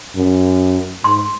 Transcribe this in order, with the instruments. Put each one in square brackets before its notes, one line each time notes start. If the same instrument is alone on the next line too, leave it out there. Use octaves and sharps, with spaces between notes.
[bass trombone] F#2
[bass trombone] G#2 [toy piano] C6